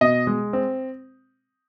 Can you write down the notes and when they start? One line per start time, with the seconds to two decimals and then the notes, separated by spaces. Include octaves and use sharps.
0.01 B2 D#5
0.27 G#3
0.53 C4